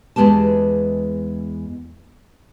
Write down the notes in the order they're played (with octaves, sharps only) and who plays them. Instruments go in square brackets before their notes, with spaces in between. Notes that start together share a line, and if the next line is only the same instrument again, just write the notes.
[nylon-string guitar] E2 G#3 B3 G4 A5